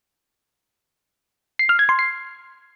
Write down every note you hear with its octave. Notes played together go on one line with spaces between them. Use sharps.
C7
F6
G#6
C6
C7